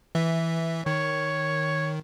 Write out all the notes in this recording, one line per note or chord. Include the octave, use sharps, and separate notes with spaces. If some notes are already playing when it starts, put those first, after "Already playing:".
E3 E5
D#3 C#5